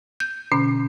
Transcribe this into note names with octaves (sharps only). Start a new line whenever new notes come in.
G6
B2 D3 C#4